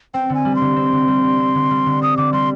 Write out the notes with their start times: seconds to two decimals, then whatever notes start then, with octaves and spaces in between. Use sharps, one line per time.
0.14 C4 G5
0.30 D3
0.35 G#5
0.45 G3
0.55 C6
0.61 D3
0.76 C4
0.92 D3
1.08 G3
1.24 D3
1.40 C4
1.55 D3
1.71 G3
1.86 D3
2.02 C4 D#6
2.17 D3 D6
2.33 G3 C6